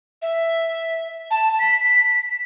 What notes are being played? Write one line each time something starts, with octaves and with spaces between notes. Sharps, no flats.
E5
A5
B6